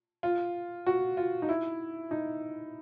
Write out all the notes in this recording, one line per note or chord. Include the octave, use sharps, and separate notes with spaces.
F4
F#4
F4
D#4
E4
D#4